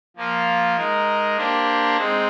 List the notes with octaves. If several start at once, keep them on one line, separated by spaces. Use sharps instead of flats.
F3 A#3 F4
G#3 D#4 A#4
A#3 D4 G4 C5
G#3 C4 D#4